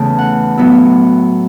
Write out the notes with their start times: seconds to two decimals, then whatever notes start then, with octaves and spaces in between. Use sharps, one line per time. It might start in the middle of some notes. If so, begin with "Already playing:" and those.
Already playing: E2 C#3 E3 A3 A5
0.19 F#5
0.57 A2 F#3 B3 E4